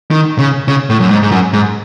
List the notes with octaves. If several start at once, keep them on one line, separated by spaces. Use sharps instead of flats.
D#3
C#3
C#3
A2
F#2
G#2
G#2
F#2
G#2